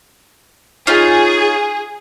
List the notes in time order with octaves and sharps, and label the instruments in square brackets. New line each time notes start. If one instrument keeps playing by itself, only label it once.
[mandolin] C#4 D#4 F4 [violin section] G#4